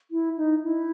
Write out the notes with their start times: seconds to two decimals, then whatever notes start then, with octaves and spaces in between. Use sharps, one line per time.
0.11 E4
0.37 D#4
0.63 E4